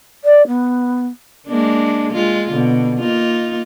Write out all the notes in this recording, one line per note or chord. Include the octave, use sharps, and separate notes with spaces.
D5
B3
G#3 A#3 D4
G#3 F4
B2 D3
A#3 D#4 F4